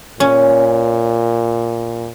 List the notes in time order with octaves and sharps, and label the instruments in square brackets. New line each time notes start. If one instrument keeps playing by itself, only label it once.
[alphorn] A#2 [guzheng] C#4